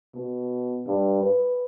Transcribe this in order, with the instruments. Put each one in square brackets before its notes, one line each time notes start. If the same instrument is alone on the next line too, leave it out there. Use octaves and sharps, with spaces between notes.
[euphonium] B2
G2
B4